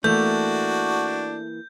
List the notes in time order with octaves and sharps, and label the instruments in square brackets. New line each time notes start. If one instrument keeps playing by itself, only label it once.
[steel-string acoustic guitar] E3 A#3 [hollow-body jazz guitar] A3 [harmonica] D4 F#4 [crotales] G6